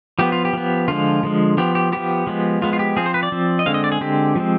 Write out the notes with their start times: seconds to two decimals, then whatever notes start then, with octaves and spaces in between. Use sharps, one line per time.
0.19 F3 B3 G4
0.32 F4
0.45 G4
0.53 F3 B3
0.88 D3 F3 G#3 F4
1.23 D3 F3 G#3
1.57 F3 B3 G4
1.75 G4
1.92 F3 B3 G4
2.27 F3 G#3 B3
2.62 F3 G#3 B3 F4
2.73 F4
2.79 G4
2.96 F3 C4 G#4
3.06 C5
3.14 B4
3.23 D5
3.32 F3 C4
3.59 D#5
3.66 D3 G#3 C4 F5
3.74 D#5
3.84 D5
3.92 G#4
4.01 D3 G#3 C4 G4
4.35 F3 G#3 C4